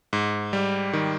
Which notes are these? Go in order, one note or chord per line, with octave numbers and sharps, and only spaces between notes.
G#2
G3
D#3